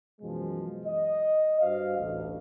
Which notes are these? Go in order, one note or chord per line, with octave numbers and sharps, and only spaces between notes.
F#2 B2 E3 F3 G#3
D#5
G2 F#4 C5 F5
A1 D2